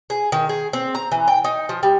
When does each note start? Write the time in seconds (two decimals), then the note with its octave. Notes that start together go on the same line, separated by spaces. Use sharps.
0.10 G#4
0.32 D#3
0.49 G#4
0.73 C4
0.95 A#5
1.12 E3
1.28 G5
1.44 D#4
1.69 F3
1.83 G3